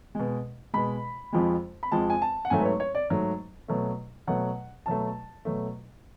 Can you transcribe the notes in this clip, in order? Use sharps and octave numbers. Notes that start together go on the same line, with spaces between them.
B2 G#3
B2 G#3 B5
F2 F3 G#3
B5
F2 F3 G#3 A5
G#5
A5
F#5
G#2 F#3 A3 G#5
B4
C#5
C#5
D5
G#2 F#3 A3
B2 F#3 A3
B2 F#3 A3 F#5
B2 F#3 A3 A5
B2 F#3 A3